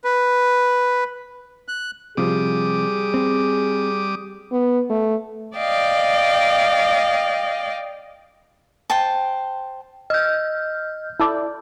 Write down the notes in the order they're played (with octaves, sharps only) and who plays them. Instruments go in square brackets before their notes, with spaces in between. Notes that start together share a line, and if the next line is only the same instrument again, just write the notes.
[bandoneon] B4
F#6
[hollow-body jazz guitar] C3 F3 [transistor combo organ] G3 D6 D#6 [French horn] G#4
[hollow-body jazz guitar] C4
[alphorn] B3
A3
[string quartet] D5 D#5 F5 G5
[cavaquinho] C5 G5 A5
[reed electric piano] D#5 E6 [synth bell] F6 G6
[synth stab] E4 A4 D5